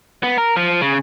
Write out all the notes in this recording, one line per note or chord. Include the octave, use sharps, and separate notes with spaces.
B3
A#4
F3
C#3